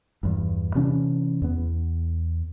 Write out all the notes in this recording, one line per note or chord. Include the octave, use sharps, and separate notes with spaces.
E2 G2
C3 E3 C#4 D4
E2 B3